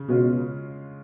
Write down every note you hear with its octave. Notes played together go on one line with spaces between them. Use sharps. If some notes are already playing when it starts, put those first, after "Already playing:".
Already playing: C#3
B2 G#3 C#4 F4
C#3